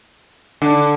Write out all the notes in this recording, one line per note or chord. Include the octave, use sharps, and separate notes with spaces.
D3